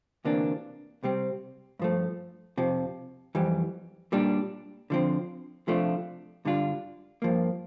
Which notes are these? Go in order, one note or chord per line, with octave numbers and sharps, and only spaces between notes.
D2 C3 E3 A#3 D4
C2 C3 G3 C4
G2 F3 A3
F2 C3 F3
F2 E3 G3
A#2 G3 D4
D3 F3 C4
C3 F3 A3 D4 F4
G2 D3 G3 D4 F4
G2 F3 A#3